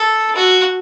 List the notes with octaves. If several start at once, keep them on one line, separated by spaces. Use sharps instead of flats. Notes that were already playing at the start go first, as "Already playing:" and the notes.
Already playing: A4
F#4